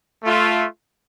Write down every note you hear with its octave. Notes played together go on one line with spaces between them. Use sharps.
A3 F4